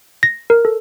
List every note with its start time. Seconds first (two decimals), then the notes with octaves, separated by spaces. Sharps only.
0.23 A#6
0.50 A#4
0.65 A4